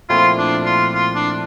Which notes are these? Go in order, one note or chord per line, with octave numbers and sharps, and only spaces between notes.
A#2 F3 A3 C4 E4 F4
D4
F4
F4
D4